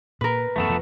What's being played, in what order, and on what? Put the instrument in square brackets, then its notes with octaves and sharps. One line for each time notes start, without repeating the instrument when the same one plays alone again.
[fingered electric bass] A#2 [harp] A#4 B4
[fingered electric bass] F#2 A2 E3 [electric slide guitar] A3 B3 A4
[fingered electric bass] F1 F3